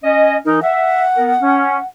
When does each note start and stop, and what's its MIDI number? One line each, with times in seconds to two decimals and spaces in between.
0.03 0.36 61
0.03 0.36 75
0.45 0.59 52
0.45 0.60 63
0.45 0.59 70
0.62 1.03 76
0.62 1.86 78
1.17 1.33 59
1.17 1.33 70
1.40 1.76 61